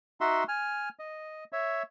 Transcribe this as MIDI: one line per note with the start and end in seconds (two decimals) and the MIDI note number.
0.21 0.44 63
0.21 0.44 66
0.21 0.44 76
0.21 0.44 78
0.21 0.44 84
0.48 0.89 80
0.48 0.89 89
0.99 1.44 75
1.52 1.83 73
1.52 1.83 76